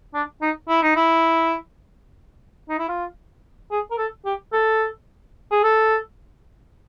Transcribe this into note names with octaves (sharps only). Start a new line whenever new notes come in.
D4
D#4
E4
D#4
E4
D#4
E4
F4
G#4
A#4
A4
G4
A4
G#4
A4